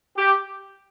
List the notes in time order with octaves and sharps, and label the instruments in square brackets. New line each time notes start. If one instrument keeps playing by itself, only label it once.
[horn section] G4